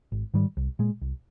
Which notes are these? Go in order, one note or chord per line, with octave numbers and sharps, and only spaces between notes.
G#1
G#2 D#3 G3
C2
A#2 G#3
C2